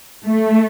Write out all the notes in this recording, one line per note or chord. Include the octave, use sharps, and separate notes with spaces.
A3